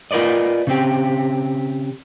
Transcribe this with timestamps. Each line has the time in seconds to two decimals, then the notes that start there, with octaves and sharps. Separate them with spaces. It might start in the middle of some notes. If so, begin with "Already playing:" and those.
0.11 F4 A#4 B4 D5 D#5
0.67 C#3 C4 G4